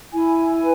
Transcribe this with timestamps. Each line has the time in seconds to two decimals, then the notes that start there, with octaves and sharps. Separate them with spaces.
0.12 E4 G#5
0.59 B4